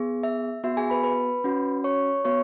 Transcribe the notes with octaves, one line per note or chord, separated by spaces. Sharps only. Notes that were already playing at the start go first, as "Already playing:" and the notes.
Already playing: B3 G#4
E5
B3 F#4 E5
G#4 G#5
B4 B5
B4 B5
C#4 F#4
C#5 C#6
B3 F#4 C#5 C#6